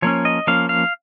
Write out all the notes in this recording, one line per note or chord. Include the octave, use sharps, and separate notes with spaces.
F3 A#3 C#4 C#5
D#5
F3 A#3 C#4 F5
F5